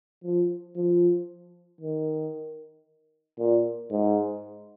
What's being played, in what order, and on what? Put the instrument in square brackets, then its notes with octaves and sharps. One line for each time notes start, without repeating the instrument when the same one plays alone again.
[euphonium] F3
F3
D#3
A#2
G#2